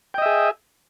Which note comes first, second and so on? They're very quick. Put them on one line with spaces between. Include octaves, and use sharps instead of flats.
G5 D#5 E5 G#4